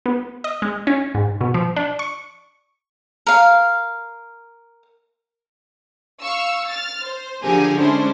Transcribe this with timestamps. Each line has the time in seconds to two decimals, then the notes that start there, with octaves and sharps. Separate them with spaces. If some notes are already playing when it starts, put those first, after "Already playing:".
0.06 B3
0.44 D#5
0.62 G#3
0.87 C#4
1.15 G#2
1.41 B2
1.54 F3
1.76 D4
1.99 C#6
3.27 A#4 F5
6.22 F5 C#6 E6
6.68 F6 A6
7.02 C5
7.43 D3 F3 G4 G#4 A#4 G#5
7.76 G#3 C#4 D4 E4 C5